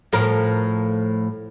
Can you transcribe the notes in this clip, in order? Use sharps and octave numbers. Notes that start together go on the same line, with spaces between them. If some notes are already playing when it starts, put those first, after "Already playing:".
A2 F3 A#4